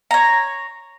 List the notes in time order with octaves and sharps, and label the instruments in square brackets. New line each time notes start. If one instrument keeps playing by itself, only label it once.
[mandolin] C#5 A#5